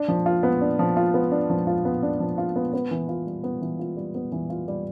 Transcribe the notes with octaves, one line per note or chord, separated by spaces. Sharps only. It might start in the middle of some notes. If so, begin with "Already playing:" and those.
Already playing: D4
F3
F4
B3
D4
F3
F4
B3
D4
F3
F4
B3
D4
F3
F4
B3
B3
E3
F4
G3
B3
E3
F4
G3
B3
E3
F4
G3